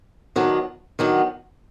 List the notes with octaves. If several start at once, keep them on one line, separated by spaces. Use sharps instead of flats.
D#3 F#3 B3 D4
D#3 F#3 B3 D4